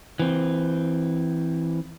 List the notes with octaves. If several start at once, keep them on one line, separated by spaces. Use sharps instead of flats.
E3 C4